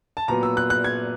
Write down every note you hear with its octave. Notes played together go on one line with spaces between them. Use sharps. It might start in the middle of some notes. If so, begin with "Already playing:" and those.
A5
A#2 F#3 B3 A#5
E6
F#6
F#6
G#6